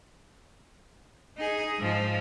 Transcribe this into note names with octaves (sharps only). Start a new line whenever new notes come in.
D#4 G#4
G#2 F3